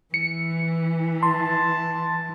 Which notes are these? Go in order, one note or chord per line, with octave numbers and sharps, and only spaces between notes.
E3 C#7
A5 C6